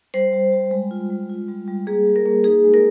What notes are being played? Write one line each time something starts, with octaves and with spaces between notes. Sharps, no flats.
G3 C5
G3
G3
G#3
F4
G#3
F4
G3
G3
A#3 G#4
G3
A#4
A#3
D#4 G#4
G#3
A#4